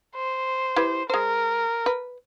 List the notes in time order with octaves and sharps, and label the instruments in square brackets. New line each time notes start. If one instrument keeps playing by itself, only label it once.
[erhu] C5
[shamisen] E4 G4 B4
[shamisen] G#3 C5 [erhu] A#4
[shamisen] B4